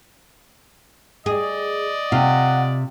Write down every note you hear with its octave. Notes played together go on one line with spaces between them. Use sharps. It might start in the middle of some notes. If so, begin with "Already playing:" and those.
G#4 D5 D#5
C3 F4 F#5